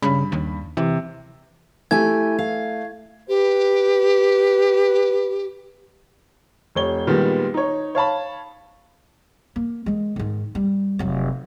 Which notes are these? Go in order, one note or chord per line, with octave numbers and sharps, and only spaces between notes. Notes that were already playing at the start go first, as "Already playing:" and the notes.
G2 C#3 B5
D#2
C3 E3
A3 E4 G4 G#5 G#6
F5
G4 B4
F1 C#5 G7
A#2 D#3 G3 G#3 B3
D#4 C#5
C#5 F5 A5 B5
A#3
D#3 G#3
G#2 D#3
G3
F1 F#3